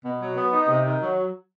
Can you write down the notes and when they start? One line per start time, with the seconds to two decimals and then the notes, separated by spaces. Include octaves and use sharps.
0.04 B2
0.20 F#3
0.36 B3
0.52 D#4
0.68 C3
0.85 D#3
1.01 F#3